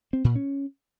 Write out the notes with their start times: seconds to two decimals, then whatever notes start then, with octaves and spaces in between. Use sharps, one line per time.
0.13 C4
0.24 A#2
0.36 C#4